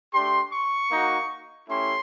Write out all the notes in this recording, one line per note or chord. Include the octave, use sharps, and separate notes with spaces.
A3 D4 G4 C6
C#6
A#3 D#4 F#4
A3 C#4 E4 G4 C6